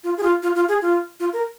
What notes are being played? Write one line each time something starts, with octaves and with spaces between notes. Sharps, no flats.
F4
G#4
F4
F4
F4
G#4
F4
F4
A#4